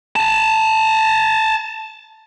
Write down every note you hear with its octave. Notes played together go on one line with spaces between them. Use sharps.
G#5 A5